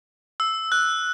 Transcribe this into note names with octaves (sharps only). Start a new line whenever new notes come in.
E6
F#6